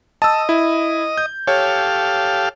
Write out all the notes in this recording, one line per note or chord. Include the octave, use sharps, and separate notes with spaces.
D#5 A5 E6
E4
G6
G4 A4 C#5 F5